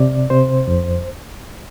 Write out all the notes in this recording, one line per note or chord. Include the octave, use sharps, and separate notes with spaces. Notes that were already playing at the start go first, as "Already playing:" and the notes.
Already playing: C3 D5
C3 C5
F2